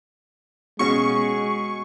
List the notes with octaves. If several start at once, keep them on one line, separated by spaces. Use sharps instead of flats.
B2 G#3 C#4 F#4 G#4 C#6